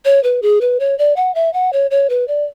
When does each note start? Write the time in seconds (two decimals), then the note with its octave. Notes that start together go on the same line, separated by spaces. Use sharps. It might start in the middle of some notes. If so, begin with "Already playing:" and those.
0.05 C#5
0.24 B4
0.42 G#4
0.61 B4
0.80 C#5
0.98 D5
1.16 F#5
1.35 E5
1.53 F#5
1.73 C#5
1.91 C#5
2.10 B4
2.28 D5